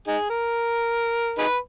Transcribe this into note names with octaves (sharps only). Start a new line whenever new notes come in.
D#4 G#4
A#4
D#4 G#4 B4